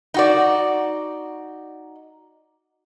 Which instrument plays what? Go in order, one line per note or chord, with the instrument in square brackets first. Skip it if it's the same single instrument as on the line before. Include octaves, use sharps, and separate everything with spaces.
[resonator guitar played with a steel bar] D#4 F#4 D5